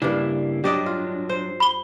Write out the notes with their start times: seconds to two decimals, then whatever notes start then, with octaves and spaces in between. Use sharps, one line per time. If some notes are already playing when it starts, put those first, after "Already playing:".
0.02 G2 C#3 A#3 D4 E4
0.64 F#3 D4 G4 D5 D#5
0.86 F4
1.29 C5
1.60 B5 G7